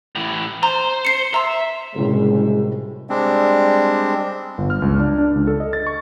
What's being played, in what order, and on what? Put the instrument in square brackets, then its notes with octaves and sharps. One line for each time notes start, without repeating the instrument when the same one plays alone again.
[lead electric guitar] A2 E3
[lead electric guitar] C5 [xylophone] A#5
[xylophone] C7 C#7
[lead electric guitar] E5 [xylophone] A#5 C6
[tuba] F#1 [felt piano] A2 C3 G3 [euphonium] G#3
[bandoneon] G3 G#3 C4 D4
[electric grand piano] G1
F6
C#2
D4
D4
C#2
A4
D#5
A6
C#6